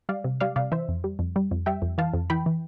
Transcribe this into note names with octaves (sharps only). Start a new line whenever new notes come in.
G3 D5 F5
C3
G3 D5 F5
C3 D5 F5
E3 C5 E5
F2
G3
F2
G3
F2
G3 E5 G5
F2
E3 F5 A5
F2
E3 G5 B5
E3